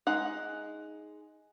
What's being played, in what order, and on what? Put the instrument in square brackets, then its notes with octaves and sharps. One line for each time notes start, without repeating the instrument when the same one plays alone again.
[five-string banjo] G#3 D#4 F#5